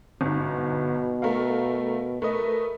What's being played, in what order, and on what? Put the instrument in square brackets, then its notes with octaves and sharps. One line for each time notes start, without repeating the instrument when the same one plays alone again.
[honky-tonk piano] G1 G#2 [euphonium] B2
[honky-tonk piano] A3 A#4 F5
[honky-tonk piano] A3 B4 D#5 [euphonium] A#4